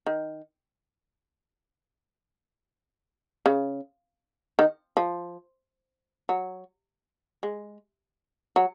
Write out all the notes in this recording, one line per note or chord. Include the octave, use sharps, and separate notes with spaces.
D#3
C#3
D#3
F3
F#3
G#3
F#3